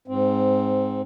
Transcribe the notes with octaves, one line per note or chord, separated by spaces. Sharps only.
G#2 C4